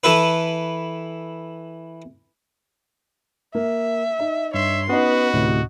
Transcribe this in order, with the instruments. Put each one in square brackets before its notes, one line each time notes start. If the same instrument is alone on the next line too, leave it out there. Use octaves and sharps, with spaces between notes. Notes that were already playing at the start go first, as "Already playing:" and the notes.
[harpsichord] E3 A4 B4
[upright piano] A#3 [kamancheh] E5
[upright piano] D#4
[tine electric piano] G2 [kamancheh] C#5 C6 [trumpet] E5
[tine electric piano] B3 [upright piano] C#4 D#4 [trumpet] F#4 [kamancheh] B4
[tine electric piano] D2 A2 C3